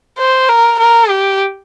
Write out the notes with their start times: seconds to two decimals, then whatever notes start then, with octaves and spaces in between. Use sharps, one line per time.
0.19 C5
0.49 A#4
0.79 A#4
1.09 G4